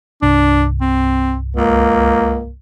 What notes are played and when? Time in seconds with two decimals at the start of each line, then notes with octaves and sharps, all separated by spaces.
0.22 C2 G2 D4
0.81 C4
1.56 C#2 A#3